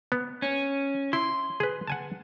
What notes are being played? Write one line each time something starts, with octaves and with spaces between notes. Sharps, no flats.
B3
C#4
E4 C6
G#4 B4
F#5 G#5 A5